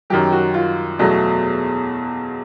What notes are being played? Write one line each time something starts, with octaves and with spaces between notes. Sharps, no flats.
F#2 D#3 F#3 G4
F#4
F4
E2 B2 F#3 A3